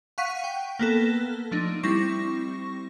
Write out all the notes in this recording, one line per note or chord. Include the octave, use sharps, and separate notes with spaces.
F5 F#5 C#6 F#6 B6 D#7
G5
A#3 B3 A4
F3 A3 D4 D#4
G3 C4 E4 C#6 A#6